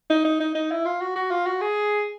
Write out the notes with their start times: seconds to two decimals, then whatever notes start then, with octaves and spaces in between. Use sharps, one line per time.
0.10 D#4
0.25 D#4
0.40 D#4
0.55 D#4
0.71 E4
0.86 F4
1.01 F#4
1.15 F#4
1.31 F4
1.46 F#4
1.61 G#4